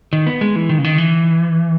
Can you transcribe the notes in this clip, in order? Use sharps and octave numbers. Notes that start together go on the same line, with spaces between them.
D#3
B3
G#3
E3
D#3
C#3
D#3
E3